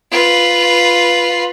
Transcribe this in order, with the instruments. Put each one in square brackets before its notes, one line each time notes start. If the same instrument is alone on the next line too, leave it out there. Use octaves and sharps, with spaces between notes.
[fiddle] F4 B4